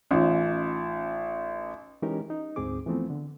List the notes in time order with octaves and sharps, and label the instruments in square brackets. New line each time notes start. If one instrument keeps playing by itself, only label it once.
[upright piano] A1 [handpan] C#4 D#4 F4
[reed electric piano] E3 G#3 C#4 D#4 G4 A#4
D#4
D2 G#2 C4 G#4 D6
E3 F3 A3 B3 C4
D3